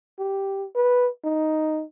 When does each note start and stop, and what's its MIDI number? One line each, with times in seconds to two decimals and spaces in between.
0.19 0.67 67
0.76 1.08 71
1.25 1.83 63